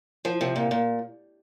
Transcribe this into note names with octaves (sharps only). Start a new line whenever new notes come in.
F3
C3
A#2
A#2